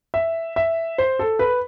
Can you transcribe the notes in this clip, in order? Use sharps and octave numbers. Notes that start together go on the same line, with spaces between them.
E5
E5
C5
A4
B4